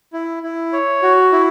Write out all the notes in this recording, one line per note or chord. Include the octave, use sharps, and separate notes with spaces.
E4
E4
C#5
F#4
E4